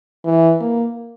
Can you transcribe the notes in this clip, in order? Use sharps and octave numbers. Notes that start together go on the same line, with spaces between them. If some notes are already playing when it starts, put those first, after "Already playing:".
E3
A#3